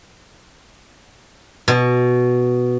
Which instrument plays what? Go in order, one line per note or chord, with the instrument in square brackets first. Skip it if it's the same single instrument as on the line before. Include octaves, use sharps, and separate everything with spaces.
[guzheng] B2